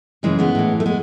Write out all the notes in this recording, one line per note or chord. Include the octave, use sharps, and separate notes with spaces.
F#2 C#3 E3 G#3
G#3 B3
A2 E3
A3
G#3 B3